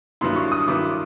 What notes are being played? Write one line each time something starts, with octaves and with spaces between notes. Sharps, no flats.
G2 D#3 F#3 B3 E4 C6
C#6
D#6
G2 D#3 F#3 B3 E4 D6